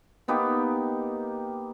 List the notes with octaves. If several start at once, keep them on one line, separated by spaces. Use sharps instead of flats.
A#3 B3 D#4 G4